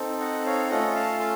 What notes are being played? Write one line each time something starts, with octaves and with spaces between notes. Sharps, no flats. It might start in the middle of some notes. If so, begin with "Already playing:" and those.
Already playing: C4 D#4 A4
D#5 F#5
C#5 F5
A3 C#4 F4 A4 D#5 F#5
F5 A5
A5 C6